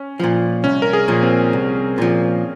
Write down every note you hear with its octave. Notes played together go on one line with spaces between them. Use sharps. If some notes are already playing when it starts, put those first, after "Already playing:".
Already playing: C#4
A#2 F3
C2 C#4
A#4
G#4
A#2 F3
C4
C2
A#2 F3